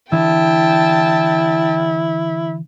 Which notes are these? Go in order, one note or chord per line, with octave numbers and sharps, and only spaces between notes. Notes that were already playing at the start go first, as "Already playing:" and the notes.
D3 E3 E4 G5 A5